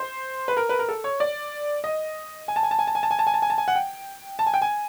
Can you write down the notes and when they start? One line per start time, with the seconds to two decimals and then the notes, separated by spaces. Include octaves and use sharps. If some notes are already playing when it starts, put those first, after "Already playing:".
Already playing: C5
0.48 B4
0.57 A#4
0.69 B4
0.79 A#4
0.89 A4
1.04 C#5
1.20 D5
1.84 D#5
2.48 G#5
2.56 A5
2.63 G#5
2.71 A5
2.79 G#5
2.87 A5
2.95 G#5
3.03 A5
3.11 G#5
3.19 A5
3.27 G#5
3.34 A5
3.42 G#5
3.50 A5
3.58 G#5
3.68 F#5
3.75 G5
4.39 A5
4.47 G#5
4.54 G5
4.62 G#5